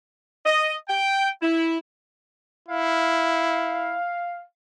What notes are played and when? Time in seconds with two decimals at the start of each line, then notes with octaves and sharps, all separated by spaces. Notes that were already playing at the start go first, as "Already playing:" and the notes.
0.46 D#5
0.89 G5
1.42 E4
2.68 E4 F5